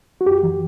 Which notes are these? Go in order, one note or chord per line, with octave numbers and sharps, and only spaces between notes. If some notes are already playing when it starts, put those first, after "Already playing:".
F#4
F#2 G4
E3